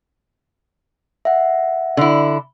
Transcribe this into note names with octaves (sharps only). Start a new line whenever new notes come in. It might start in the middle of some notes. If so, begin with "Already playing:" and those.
E5 F#5
D3 E4